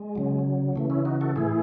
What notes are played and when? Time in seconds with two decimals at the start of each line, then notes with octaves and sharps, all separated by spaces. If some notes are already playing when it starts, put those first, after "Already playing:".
Already playing: G#3
0.16 C#3 F#3
0.76 C#3 E3 A3
0.90 C#4 E4
1.05 D#4 F#4
1.21 F#4 A4
1.36 A2 E3 E4 G#4